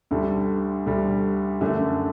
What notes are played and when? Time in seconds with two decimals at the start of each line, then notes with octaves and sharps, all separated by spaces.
0.11 D2 D3 G3
0.86 D2 D3 G3
1.61 F#2 D3 A3 D4